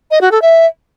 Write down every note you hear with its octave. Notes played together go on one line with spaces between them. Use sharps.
D#5
F#4
A4
E5